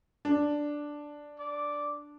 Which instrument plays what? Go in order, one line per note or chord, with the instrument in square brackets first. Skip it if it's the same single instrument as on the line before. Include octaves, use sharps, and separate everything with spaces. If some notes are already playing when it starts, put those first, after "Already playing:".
[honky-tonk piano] D4
[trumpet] D5